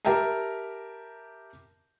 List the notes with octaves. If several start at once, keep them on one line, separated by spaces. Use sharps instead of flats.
G4 A#4 E5 G5 A5 A#5